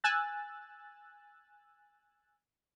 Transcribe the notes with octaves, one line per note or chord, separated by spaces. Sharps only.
G#5 E6 F#6 A6